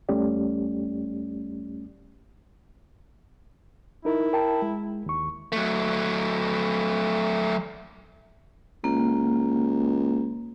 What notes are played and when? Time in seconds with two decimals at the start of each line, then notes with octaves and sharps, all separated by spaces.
0.09 E2 G3 A3 C#4 G4 D5
4.05 D#4 E4 A#4
4.33 A#4 G5 A5
4.62 G#3
5.06 D#2 C#6
5.52 F#3 A3
8.84 C#2 A#3